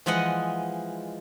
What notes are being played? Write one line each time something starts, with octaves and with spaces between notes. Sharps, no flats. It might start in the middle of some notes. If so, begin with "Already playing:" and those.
E3 F3 G#3 D#5 F#5